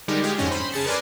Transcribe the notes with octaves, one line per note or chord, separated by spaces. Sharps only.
D3 G3 G#3 D#4 G4 A#4
G#3 F4 G4 G#4
F2 G#2 D3 C#4 D#5
C5 B5 C6
C#3 G#4 A5 C#7
A#4 B4 D5 G#5 C6